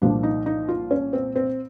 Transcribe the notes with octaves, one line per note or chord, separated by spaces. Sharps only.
C2 A#2 F3 A#3 D4
D#4
D#4
F4
C#4
C4
C4